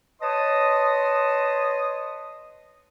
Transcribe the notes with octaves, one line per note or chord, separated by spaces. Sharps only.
B4 C#5 D#5 A5 C6 D#6